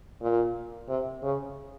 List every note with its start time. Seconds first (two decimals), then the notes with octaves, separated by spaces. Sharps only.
0.21 A#2
0.88 C3
1.23 C#3